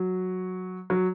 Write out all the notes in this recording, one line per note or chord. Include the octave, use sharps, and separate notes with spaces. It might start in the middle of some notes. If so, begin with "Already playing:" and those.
Already playing: F#3
F#3